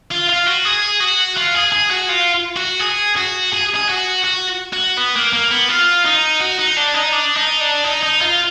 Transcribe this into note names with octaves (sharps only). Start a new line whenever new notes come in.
F4
F4
F#4
G#4
F#4
F4
G#4
G#4
F#4
F4
F#4
G#4
F#4
G#4
G#4
F#4
F#4
F#4
B3
A#3
A#3
B3
F4
D#4
F#4
D#4
D4
D#4
D4
D#4
D4
D#4
D#4
F4